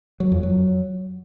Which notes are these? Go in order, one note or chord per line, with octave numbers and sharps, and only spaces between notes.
F#3
F2
F#3